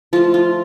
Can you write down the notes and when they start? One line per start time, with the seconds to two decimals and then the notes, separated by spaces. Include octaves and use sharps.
0.13 F3 A3 F4
0.34 F4